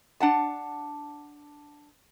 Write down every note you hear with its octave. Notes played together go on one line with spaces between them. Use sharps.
D4 F#5 A5